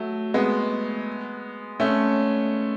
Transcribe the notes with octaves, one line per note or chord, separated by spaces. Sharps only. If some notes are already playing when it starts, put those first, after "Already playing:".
Already playing: F#3 A3
G#3 B3
A3 C#4